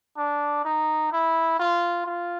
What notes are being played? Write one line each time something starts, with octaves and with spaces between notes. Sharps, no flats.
D4
D#4
E4
F4
F4